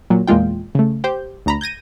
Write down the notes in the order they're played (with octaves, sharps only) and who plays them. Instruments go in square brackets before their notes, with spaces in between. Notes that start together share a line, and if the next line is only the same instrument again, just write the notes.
[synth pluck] A#2 F#3
E2 A#2 G#3 F4 G5
C#3 A3
G4 C5 G6
D2 A#5 B5
G6 G#6 A#6 D#7